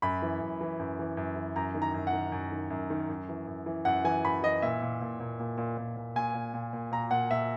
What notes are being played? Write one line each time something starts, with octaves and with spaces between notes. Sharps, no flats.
F#2 B5
E3
F#2
E3
F#2
E3
F#2
E3
F#2 A#5
D#3
A#5
F#2
F#5
D#3
F#2
D#3
F#2
D#3
F#2
E3
F#2
E3
F#2 F#5
E3 G#5
F#2 B5
E3 D#5
A#2 E5
A#2
A#2
A#2
A#2
A#2
A#2
A#2
A#2 G#5
A#2
A#2
A#2
A#2 A#5
A#2 F#5
A#2 E5